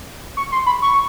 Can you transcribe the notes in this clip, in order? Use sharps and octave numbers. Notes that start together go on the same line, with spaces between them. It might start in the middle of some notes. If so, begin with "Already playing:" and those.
C#6
C6
B5
C#6